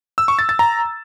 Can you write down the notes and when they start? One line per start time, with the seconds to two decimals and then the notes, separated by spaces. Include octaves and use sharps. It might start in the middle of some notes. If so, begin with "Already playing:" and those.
0.18 E6
0.28 C#6
0.39 A6
0.49 A6
0.59 A#5